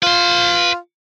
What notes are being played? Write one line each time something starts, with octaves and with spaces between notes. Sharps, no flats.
F4 B4 C6